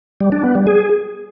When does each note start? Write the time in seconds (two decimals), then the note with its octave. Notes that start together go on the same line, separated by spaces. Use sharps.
0.21 G3
0.32 D4
0.44 B3
0.55 G3
0.67 G#4